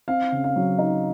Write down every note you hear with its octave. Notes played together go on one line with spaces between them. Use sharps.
C4 F5
C#3
F5
F#3
D#4